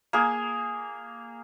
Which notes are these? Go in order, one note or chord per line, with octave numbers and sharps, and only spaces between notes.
A#3 G#4